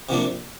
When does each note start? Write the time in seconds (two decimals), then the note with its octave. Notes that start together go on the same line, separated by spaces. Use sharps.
0.09 C3 F3 A#3 D4